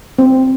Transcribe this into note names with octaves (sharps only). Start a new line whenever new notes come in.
C4